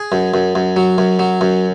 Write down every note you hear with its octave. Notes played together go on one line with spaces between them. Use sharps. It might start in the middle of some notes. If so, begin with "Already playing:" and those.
Already playing: G#4
F#2
F#2
F#2
F#3
F#2
F#3
F#2